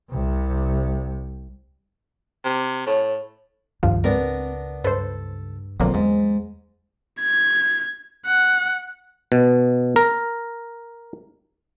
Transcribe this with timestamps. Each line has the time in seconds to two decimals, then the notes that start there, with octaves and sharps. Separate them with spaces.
0.11 C2 C3
2.45 C3
2.87 A2 C#5
3.83 C#2 G2 D#3 F3 F4
4.04 G#2 B3 C4 D4 A#4
4.84 G2 A4 B4 C5
5.80 F2 B2 D3 F#3 A#3 C4 C#4
5.94 E2 G#2
7.21 G#6
8.26 F#5
9.32 B2
9.96 A#4